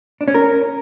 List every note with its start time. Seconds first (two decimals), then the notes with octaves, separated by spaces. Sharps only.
0.21 D4
0.28 C#4
0.35 A#4